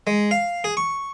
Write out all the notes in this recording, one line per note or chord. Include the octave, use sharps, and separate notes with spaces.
G#3
F5
G#4
C#6